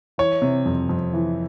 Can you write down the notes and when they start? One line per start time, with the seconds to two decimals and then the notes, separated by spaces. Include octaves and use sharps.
0.18 E3 C#5
0.42 C3
0.66 F2
0.89 F2
1.14 E3